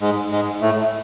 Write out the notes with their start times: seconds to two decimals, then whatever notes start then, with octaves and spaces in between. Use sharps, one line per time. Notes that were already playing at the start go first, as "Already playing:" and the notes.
0.01 G#2 G#3
0.31 G#2 G#3
0.61 A2 A3